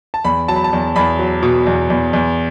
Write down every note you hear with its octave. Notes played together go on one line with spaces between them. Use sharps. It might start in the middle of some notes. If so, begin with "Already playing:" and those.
A5
E2 B5
F#3 A5
B5
A5
E2
E2 B5
F#3
B2
E2
E2
E2